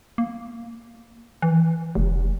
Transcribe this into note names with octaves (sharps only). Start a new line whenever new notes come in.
A#3
E3
F1